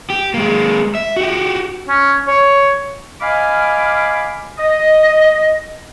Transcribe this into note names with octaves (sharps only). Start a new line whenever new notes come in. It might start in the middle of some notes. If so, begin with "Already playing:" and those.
G4
G#3 A#3
E5
F#4 G4
C#4
C#5
D#5 F5 G#5 B5 D6 F6
D#5